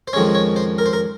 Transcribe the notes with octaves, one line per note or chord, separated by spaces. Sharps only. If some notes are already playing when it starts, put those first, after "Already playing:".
C5
F2 D#3 G#3 C#4 C#5
C#5
C5
A#4
C5
A#4